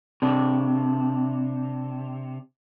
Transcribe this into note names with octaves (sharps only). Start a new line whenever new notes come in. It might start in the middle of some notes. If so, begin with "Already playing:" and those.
C3 D4